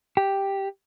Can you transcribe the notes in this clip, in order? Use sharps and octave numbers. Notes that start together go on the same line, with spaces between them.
G4